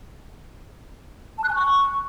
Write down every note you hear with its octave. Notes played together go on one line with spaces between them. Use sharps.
A5
F#6
G#5
C#6